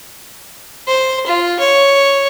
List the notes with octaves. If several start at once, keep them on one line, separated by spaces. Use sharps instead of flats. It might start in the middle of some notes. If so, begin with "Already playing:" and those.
C5
F4
C#5